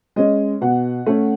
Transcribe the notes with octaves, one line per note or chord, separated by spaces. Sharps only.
G#3 C#4 D#5
B2 F#5
A3 C#4